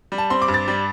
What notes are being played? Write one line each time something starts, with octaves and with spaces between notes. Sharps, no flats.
G3
A5
C4 C6
D6
G2
A6
G3